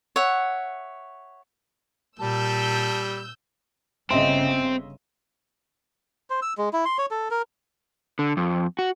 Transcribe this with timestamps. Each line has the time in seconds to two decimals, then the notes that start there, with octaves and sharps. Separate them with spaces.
0.16 C#5 E5 F#5
2.19 A#2 G3 A5 E6 G6
4.11 G1 C#3 C4 D#5 E5 C6
6.30 C5
6.42 E6
6.58 G#3
6.73 E4
6.85 C6
6.98 C#5
7.11 A4
7.31 A#4
8.19 D3
8.37 F2
8.79 F#4